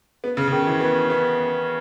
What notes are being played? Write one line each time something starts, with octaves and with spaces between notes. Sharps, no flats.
B3
C#3
C#3
D#3
E3
B3
B3